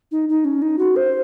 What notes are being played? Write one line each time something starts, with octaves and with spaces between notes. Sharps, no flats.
D#4
D#4
C#4
D#4
F#4
C5